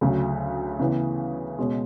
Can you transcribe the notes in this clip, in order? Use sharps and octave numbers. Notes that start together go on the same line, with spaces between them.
D2 C#3 F#3
C#3 E3 B3
B2 G#3 C#4